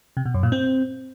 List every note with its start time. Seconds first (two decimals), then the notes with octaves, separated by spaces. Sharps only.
0.17 C3
0.25 B2
0.34 F#2
0.43 A#2
0.52 C4